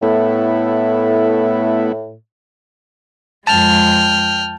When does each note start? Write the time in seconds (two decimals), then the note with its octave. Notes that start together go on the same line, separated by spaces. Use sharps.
0.03 A2 A3 B3 E4
3.47 F2 G#3 G5 A5 F6